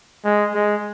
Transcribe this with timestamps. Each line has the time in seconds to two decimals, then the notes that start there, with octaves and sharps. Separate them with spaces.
0.24 G#3
0.54 G#3